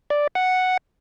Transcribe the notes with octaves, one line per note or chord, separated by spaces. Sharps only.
D5
F#5